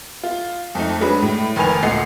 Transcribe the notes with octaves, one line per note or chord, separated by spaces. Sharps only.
F4
F2 A3 D#4
F#3 G#3 D4 B4
A2
F1 D#3 B4 G#5 F7
D2 A#2 A4 D#5 F#5 C7